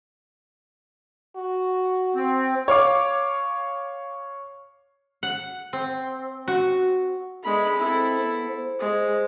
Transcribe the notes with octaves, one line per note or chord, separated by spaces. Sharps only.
F#4
C4
C#5 F5 D6
F#5
C4
F#4
G#3 A3 B3 D4 B5
C4 E4 A4
B3
C5
G#3